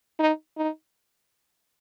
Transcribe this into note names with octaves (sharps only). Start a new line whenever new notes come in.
D#4
D#4